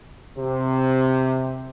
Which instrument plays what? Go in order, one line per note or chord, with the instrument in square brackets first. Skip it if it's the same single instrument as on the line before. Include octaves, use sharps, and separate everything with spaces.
[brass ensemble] C3